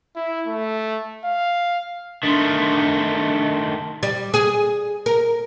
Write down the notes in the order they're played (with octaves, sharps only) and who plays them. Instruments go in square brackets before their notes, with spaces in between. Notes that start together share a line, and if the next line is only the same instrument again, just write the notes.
[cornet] E4
A3
F5
[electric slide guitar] D#3 A3 [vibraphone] D4 C6
[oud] G3
G#4
A#4